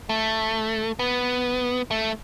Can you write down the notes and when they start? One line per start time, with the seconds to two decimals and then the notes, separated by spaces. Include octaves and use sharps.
0.09 A3
0.99 B3
1.91 A3